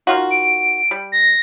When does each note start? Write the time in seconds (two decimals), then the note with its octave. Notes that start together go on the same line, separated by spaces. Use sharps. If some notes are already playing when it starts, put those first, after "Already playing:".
0.07 D#3 F4 F#4
0.31 D7
0.91 G3
1.12 A#6